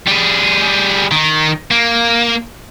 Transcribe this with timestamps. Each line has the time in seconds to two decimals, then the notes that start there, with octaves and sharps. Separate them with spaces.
0.08 G3 G#4
1.11 D#3 D#4
1.71 A#3